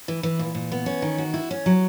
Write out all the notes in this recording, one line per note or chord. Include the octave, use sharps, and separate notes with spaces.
E3
E3
A#2
A#2
B3
C#4
D#3
F#4
E4
C#4
F#3